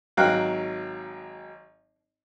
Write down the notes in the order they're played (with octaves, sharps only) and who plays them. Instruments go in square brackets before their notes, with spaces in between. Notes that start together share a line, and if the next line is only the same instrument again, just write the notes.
[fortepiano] G#1 F#3 F5 G5 A#5 F#6